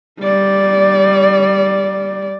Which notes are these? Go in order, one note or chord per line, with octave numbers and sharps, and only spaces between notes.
G3 D5